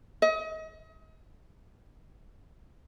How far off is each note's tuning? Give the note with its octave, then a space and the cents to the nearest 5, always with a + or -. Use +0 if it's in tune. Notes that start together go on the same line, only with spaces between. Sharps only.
D#5 +35